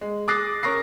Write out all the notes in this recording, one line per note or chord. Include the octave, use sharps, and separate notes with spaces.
G#3
D6 D#6 F#6 A6 A#6 C7
C#4 A#4 C#6 A#6 C7